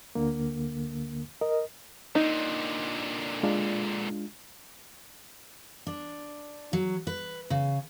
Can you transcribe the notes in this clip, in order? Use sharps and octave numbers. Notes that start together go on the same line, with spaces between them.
D2 D3 A#3
A#4 D#5
A#2 D3 D#4
G#3 D4 F4
D4
F#3
B4
C#3